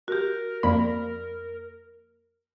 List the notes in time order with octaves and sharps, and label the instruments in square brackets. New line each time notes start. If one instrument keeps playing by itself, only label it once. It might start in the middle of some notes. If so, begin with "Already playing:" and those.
[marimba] F#4 G4 [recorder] A#4
[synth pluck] F2 A#3 B5 [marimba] D5